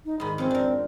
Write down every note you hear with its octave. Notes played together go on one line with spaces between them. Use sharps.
D#4
G#2 D#3 B5
F2 C4 C#4
D4 A#4